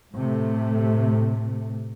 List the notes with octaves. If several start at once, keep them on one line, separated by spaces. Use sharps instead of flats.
A2 C3 A3